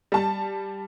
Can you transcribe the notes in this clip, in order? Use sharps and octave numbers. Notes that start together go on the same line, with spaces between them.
G3 A5